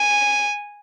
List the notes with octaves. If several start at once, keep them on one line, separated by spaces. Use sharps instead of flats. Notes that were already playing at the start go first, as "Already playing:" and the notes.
Already playing: G#5